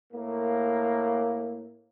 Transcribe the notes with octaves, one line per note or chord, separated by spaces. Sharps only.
A2 A#3